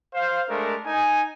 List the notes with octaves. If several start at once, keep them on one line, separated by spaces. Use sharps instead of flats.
C5 F5
G#3 A3 D4 A#4
D#4 G#5